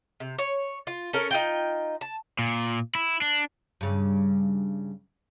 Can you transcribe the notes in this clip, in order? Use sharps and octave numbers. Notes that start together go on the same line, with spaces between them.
C3
C#5
F4
C#4 A4 A#4
D#4 F4 G5
A5
A#2
E4
D4
G2 C#3